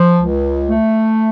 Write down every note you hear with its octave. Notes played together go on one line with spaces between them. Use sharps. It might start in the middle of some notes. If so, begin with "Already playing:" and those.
Already playing: F3
C#2
A3